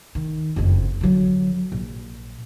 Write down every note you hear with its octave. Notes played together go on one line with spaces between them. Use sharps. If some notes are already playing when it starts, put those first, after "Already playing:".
D#3
F#1 F2
D3 F#3
A#1